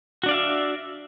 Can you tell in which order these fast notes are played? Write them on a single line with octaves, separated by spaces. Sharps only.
F#4 D4 D5 F5 E5